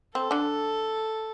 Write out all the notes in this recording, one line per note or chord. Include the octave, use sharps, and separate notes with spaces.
C4 A4
D3 D4